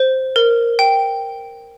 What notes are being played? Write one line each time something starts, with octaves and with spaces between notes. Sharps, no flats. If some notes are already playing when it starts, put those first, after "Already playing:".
Already playing: C5
A#4
G5